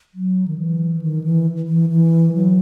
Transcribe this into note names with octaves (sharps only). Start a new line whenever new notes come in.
F#3
D#3
E3
D#3
E3
E3
E3
F#3